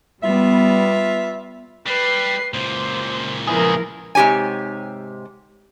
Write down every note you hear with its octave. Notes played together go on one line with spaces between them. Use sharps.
G3 B3 F4 E5
G3 B4 C7
C#2 A#2 C5
E3 F3 E4 G#4 A#4
G#2 C3 G4 C#5 G#5